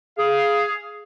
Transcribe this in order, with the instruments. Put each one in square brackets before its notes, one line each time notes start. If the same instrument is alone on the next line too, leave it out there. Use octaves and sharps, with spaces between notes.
[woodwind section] G#4 F5